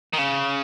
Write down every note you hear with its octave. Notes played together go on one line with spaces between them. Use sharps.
D#3
C#3